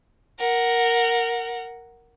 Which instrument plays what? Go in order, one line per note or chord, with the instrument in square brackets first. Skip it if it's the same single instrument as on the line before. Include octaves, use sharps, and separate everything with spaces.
[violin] A#4 F#5